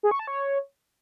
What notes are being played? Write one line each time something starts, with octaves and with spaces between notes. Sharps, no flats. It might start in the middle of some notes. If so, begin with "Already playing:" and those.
G#4
C#6
A5
C#5